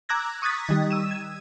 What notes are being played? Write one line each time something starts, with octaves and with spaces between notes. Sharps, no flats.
A#5 D6 E6 F#6 G#6 A#6
C#6 D#6 F#6 G#6 A6 B6
D#3 G3 D#4
E6 D#7 E7
G#6